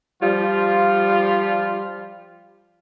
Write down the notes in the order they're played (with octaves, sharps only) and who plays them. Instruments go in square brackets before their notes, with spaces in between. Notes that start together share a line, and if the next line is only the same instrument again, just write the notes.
[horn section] F3 G3 F4